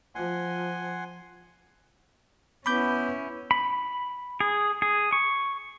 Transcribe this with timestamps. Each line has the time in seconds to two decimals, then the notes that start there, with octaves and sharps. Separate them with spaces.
0.15 F3 F#5 G#5 C6
2.66 B3 C#4 E4 B5 D6 G6
3.51 B5
4.40 G#4
4.82 G#4
5.12 C#6